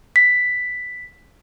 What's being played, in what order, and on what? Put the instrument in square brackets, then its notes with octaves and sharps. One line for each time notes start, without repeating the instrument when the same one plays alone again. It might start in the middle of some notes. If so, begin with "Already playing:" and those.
[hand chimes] B6